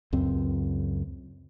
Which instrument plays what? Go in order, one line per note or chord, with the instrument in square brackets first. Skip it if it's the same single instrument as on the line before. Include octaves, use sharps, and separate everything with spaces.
[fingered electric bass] C#2 F#2 C4